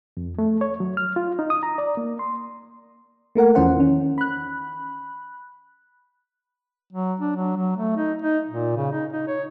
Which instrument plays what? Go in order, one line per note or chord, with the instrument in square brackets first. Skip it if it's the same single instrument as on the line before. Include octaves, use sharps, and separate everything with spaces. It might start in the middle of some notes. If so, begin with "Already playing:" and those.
[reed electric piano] F2
A3
C#5
F#3
F6
F4
D#4
D#6
A#5
D5
A#3
C6
[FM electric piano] A3 A#3 A#4 F#5
E2 E3 F3 C#4 C5 F#5
D#3 C#4
B5 F#6
[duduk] F#3
D4
F#3
F#3
A3
D#4
D#4
A#2
C#3
D#4
D#4
C#5